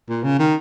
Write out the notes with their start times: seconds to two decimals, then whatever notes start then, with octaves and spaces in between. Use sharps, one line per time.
0.09 A#2
0.24 C#3
0.39 D#3